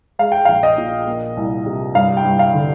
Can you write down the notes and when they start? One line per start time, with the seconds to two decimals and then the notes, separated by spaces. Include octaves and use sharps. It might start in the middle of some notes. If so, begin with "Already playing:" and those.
0.19 G#3 F5
0.32 G5
0.45 A#1 F5
0.63 D#5
0.78 A#2
1.07 A#3
1.37 C2
1.66 C3
1.95 G2 F5
2.17 G5
2.24 G2
2.39 F5
2.54 D3